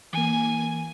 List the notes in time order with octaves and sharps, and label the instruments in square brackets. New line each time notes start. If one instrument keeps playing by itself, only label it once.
[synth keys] E3 A#3 [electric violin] G#5